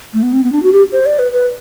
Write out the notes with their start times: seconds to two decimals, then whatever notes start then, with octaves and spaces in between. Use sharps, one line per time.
0.14 A3
0.23 B3
0.33 C4
0.43 B3
0.52 D4
0.63 F#4
0.73 G4
0.92 C5
1.06 D5
1.19 B4
1.33 B4